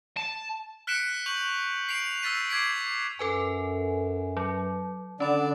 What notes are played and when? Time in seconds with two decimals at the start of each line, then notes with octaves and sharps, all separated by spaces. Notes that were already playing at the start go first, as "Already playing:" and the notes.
0.17 A5
0.87 F6 F#6 B6 C#7 D7 E7
1.26 C#6 G6 F7 F#7
1.89 C7 D7 F7
2.22 E6 F6 A6 B6 D#7
2.49 D6 G#6 B6 C7 D7
3.19 F#2 A4 B4 G#5
4.37 F#3
5.20 D3 C#4 D4 D5 B5